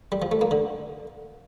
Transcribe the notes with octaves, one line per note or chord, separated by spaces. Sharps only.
G3
F3
A3
A#3
D3